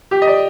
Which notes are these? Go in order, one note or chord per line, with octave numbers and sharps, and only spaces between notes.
G4
D#5
D5